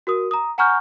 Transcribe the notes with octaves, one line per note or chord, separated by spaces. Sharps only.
F#4 A#4 D#6
A#5 D#6
F#5 G#5 A#5 C#6 F6 G6